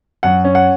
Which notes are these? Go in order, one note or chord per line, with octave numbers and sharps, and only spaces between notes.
F#2 F#5
C#4
F#5